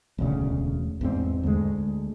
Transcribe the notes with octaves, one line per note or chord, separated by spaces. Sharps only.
E1 D2 C#3
E2 G#2 C4
D2 G#3